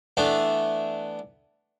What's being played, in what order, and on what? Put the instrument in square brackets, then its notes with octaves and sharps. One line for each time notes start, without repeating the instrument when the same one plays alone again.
[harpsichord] E3 A3 B3 D4